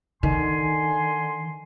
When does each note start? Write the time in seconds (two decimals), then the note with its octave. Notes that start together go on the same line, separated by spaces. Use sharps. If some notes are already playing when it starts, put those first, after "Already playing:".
0.23 D3 D#3 G#5 C6